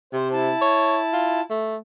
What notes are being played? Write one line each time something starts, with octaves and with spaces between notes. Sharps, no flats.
C3 C5
E4 A5
C#5
F4
A3